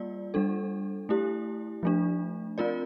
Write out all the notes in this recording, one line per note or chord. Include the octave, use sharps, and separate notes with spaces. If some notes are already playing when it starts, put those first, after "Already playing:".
Already playing: G3 A#3 F4 D5
G3 D4 A4
A3 E4 G4
F3 A3 D4
C4 F4 A#4 D5